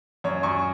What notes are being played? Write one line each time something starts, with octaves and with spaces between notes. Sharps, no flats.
F#2 C#5
F#2 G#5 C#6